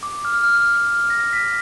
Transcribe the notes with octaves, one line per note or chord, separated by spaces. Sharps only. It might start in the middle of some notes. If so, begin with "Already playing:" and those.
D6
F6
F6
F6
A#6
B6